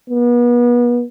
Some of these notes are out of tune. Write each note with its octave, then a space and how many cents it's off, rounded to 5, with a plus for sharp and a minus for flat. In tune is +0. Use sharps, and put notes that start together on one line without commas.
B3 -35